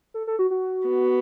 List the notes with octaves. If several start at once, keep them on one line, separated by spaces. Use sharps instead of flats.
A4
A4
F#4
F#4
B3